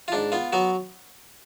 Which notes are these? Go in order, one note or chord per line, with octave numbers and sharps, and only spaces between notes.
F4
G#2 D4
B3 F4
F#3 B3 F#4